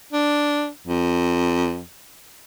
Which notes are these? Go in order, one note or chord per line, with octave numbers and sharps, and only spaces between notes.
D4
F2